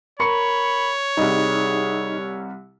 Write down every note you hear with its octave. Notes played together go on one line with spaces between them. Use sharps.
A#4 C#5 B5 C#6 C#7
C2 G3 D#4 G#4 D#5